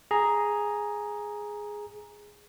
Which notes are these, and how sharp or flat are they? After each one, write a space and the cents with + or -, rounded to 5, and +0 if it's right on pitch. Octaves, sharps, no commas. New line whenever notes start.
G#4 +0 A#5 +5